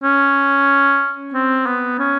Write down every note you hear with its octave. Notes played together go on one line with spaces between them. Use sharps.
C#4
C4
B3
C#4